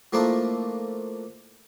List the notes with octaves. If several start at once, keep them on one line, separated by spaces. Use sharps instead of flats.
F3 A3 A#3 D4 E4